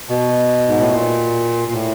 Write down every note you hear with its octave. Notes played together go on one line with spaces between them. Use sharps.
B2
G#2
A2
A#2
A#2
A2